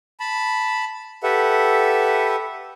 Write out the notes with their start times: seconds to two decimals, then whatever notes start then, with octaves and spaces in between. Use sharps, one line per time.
0.20 A5 B5
1.23 G4 A4 B4 E5 F#5